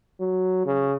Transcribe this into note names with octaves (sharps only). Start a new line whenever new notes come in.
F#3
C#3